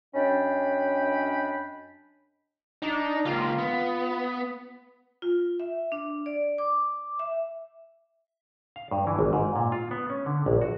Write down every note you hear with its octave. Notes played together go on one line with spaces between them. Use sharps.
F#2 C#4 D4 D#5 G5 B5
D4 D#4
C#2 A#3 F4
B3
F4
E5
D4
D5
D6
E5
F5
G2
E3
G#1
G#2
A#2
F4
B3
C#4
D3
A#1
F#4